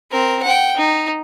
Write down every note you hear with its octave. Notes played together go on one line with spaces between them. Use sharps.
C4 A#4
F#5 G5
D#4